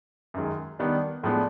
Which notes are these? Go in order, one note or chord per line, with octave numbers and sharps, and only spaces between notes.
F#2 D#3 G#3
D#3 G3 B3 D4
A2 F3 G#3 B3 D4